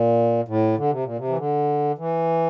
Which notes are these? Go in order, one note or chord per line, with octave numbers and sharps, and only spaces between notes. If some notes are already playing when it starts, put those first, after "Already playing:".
Already playing: A#2
A2
D3
C3
A#2
C3
E3
D3
E3